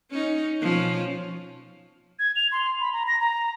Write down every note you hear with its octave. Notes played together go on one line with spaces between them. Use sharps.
C#4 D#4
B2 F3 C#4
G#6
F7
C6
B5
A#5
A#6
A#5